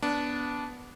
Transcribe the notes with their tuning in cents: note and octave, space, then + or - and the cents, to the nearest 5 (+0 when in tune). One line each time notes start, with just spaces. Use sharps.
B3 +0 D4 -15